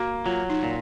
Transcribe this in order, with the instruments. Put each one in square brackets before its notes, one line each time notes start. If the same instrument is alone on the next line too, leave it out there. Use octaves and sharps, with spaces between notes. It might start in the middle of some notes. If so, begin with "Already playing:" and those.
Already playing: [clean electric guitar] A#3 [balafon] F#4
[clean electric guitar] F#3 [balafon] F4
[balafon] D#4
[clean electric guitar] A#2